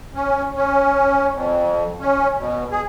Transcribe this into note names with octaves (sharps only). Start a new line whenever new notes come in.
C#4
C#4
F2
C#4
B2
G#4